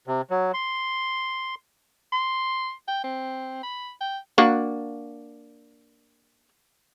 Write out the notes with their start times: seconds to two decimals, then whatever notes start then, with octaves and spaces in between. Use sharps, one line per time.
0.07 C3
0.30 F#3
0.54 C6
2.12 C6
2.88 G5
3.04 C4
3.63 B5
4.01 G5
4.38 A#3 D4 F#4